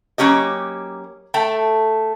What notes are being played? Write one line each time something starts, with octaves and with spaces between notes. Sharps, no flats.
F#3 A#3 C#4 G4 D#5
A3 A4 G5